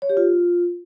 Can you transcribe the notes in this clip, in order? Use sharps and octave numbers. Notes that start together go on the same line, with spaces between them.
C#5
G4
F4